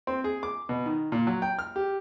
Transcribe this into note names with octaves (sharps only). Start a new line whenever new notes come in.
C4
G#4
D6
B2
D#3
A#2
F#3
G5
F6
G4